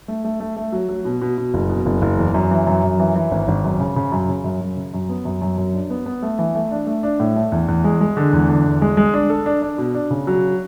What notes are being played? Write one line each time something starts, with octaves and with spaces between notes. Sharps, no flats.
A3
A3
A3
A3
F#3
F#3
B2
B2
B2
F#1
B2
F#1
F#1
E2
F#2
E3
F#2
F#2
E3
E3
G#1
G#1
F#2
C#3
C#3
F#2
C#3
F#2
F#2
C#3
F#2
B3
F#2
F#2
F#2
D4
B3
B3
A3
E3
A3
D4
A3
D4
A2
A3
E2
E2
G#3
G#3
D3
E2
D3
E2
G#3
G#3
D4
A4
D4
D4
B2
D4
C#3
F#3